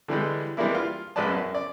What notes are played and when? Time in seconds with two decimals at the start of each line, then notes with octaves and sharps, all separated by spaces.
0.08 D3 E3 G3 G#3
0.57 E3 G3 G#3 A#3 D4 E4
0.75 F4 F5
1.16 A1 G#3 B4 D5 A5
1.28 F#2
1.55 D5